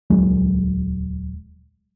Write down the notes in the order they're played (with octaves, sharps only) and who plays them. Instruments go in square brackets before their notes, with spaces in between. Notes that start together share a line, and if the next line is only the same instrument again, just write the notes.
[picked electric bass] D#1 C#2 F#3 G#3